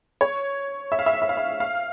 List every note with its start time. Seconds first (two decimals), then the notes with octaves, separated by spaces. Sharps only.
0.21 C#5
0.92 E5
0.99 F5
1.06 E5
1.14 F5
1.22 E5
1.29 F5
1.37 E5
1.60 F5